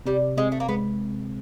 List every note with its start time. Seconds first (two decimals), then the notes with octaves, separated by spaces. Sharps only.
0.06 C3 G3
0.37 G#3 C4
0.52 A3
0.60 A#3
0.69 G#3 B3